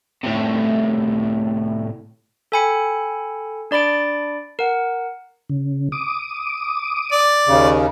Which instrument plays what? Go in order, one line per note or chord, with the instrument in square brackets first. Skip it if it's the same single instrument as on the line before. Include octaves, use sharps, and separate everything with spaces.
[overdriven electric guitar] A2 C3
[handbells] A4 G5 G#5 B5 C#7
D4 D5 B5 A6 D7
A#4 F#5
[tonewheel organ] C#3
D6 D#6
[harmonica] D5
[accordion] D#2 C#3